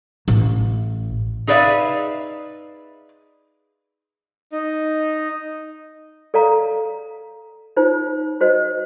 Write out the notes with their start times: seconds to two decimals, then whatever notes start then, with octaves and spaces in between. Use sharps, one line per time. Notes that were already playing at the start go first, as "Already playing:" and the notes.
0.28 A1
1.47 D#4 G#4 B4 D5 E5 F5
4.51 D#4
6.34 A4 D5 F5 A#5
7.77 D#4 F4 C5
8.41 F#4 C5 D#5